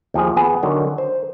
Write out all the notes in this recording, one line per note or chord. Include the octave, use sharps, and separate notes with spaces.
D#2 F3 G#4
B3 G#4 G#5
D3 D#3 F#3
C5